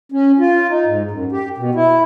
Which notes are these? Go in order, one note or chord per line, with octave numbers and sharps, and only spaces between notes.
C#4
F4
D#4
G#2
F#2
G4
B2
E4